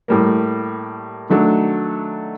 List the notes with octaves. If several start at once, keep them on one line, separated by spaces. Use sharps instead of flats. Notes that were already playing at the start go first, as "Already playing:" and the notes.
A2 G3 A#3
D#3 F#3 A3 D4